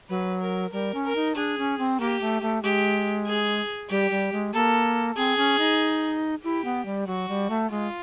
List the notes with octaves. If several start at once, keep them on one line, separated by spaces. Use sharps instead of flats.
F#3 B4
A#4
G3 A#4
C#4
A#4
D#4
D4 G#4
C#4
C4
A#3 G4
A3
A3
G#3 G4
G#4
G3 G4
G3
G#3
A#3 A4
C4 G#4
C#4
D#4
E4 G4
B3
G3
F#3 F#4
G3
A3
G#3 F4